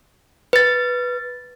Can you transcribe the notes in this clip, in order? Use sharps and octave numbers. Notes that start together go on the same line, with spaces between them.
B4 A6